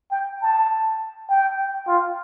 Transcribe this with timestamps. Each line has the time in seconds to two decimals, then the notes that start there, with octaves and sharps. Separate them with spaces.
0.11 G5
0.41 A5
1.30 G5
1.88 F4